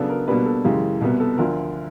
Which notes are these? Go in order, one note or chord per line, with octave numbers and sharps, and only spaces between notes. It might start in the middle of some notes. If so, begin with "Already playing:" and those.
Already playing: C#3 F#3 B3 D4 A4
A#4
B2 G3 A#3 D4 B4
A4
F#2 C#3 E3 G#3 G4
C2 B2 G3 B3
A4
D2 D3 F3 A#4